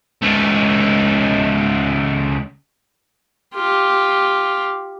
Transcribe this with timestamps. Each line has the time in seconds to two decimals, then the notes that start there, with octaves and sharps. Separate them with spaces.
0.22 C#2 A3
3.54 F4 G4